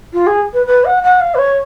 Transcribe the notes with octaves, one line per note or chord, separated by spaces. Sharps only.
F4
G#4
B4
B4
F#5
F#5
F5
B4
C#5